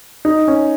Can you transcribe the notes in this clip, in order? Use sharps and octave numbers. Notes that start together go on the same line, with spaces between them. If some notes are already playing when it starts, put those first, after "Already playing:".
D#4
C#4